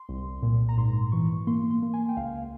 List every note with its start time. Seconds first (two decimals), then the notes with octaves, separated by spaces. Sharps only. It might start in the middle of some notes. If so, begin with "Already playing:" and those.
Already playing: C6
0.09 C2
0.43 A#2
0.69 A#5
0.78 G#2 C6
1.12 E3 C#6
1.47 A#3 C6
1.70 C6
1.82 A#3
1.94 G#5
2.09 G5
2.17 C#2 F5